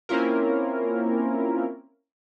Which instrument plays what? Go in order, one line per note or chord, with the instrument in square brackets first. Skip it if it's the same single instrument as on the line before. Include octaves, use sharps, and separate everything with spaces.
[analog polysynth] A#3 C4 C#4 E4 F4 A#4